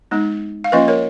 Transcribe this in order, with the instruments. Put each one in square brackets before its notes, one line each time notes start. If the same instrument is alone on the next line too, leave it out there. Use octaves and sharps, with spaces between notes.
[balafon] G#3 B3 D#4
F5
F3 A#3 C#4 F4 B4 D#5
A#4 C#5